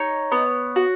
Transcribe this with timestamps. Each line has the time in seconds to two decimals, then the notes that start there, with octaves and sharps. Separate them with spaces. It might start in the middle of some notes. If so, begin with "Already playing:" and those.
Already playing: D#4 C#5
0.32 B3
0.76 F#4